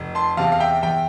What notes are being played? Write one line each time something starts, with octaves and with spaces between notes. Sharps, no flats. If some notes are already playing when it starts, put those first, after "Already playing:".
Already playing: F1
A5 C6
E2 C3 F5 A5
F5
E5 G5
E2 E5 G5